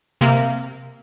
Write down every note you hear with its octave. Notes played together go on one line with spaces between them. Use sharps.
C3 A#3